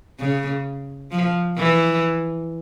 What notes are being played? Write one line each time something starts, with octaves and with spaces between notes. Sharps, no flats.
C#3
F3
E3